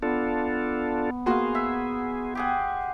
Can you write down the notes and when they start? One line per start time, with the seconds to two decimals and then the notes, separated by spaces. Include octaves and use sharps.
0.03 B3 D4 F4 A4
1.26 A#3 F#4 G#4 F5 C6
1.55 E5
2.35 G4 G#4 F#5